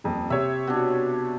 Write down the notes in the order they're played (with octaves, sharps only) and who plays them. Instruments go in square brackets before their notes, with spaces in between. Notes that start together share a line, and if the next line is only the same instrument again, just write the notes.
[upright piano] D#1 F2
[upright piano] C3 C#5 [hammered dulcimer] E5
[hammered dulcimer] B2 D4